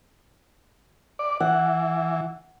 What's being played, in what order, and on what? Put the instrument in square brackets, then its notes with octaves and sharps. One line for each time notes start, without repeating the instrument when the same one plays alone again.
[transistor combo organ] D5
[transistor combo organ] E3 [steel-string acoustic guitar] F#5